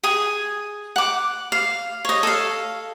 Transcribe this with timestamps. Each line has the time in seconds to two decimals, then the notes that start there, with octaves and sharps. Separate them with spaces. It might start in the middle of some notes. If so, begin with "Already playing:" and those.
0.03 G#4 G#5 D#6
0.96 F#5 D6
1.52 F5
2.05 C#5 D#5
2.23 A4 F5